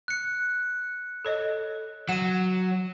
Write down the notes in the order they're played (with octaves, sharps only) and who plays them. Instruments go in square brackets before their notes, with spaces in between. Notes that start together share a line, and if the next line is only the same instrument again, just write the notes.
[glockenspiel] F#6 C#7
[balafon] A4 C#5 D#5
[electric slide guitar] F#3 [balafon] F#5 [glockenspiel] D#7 E7